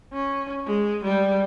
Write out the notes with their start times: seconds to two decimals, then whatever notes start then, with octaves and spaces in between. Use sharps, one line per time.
0.13 C#4
0.66 G#3
1.04 G3